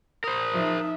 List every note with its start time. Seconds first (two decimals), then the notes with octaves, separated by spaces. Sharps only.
0.24 A#4 C5 D#6
0.54 F3 D#4 E5